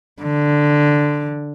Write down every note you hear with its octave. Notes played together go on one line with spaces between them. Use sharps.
D3